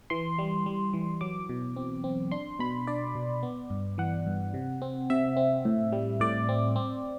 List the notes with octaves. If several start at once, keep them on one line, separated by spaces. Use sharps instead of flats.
E3 C6
G3
G3
E3
F#3 D6
B2
C4
C4
D4 C6
B2 B5
D4 D5
B2
B3
G2
E3 F#5
G2
C3
C4
C3 E5
C4
A2
G3
A2 D5
C4
C4